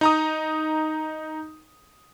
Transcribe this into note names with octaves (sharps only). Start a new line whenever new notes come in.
D#4 A#5 D#6